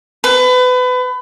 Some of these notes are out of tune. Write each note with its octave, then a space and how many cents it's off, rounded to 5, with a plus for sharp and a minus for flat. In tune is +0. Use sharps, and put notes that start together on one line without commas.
B4 +30